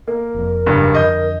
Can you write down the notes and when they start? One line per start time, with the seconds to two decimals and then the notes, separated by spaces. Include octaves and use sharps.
0.08 A#3 A#4
0.34 F1 F2
0.66 F#1 G2
0.95 F2 D3 D#5 G6